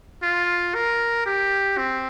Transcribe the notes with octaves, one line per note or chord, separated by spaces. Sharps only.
F4
A#4
G4
C4